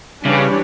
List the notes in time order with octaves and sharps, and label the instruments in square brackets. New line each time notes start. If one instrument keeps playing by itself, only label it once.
[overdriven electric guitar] C#3 [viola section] E3 G3 D4 G4 C#5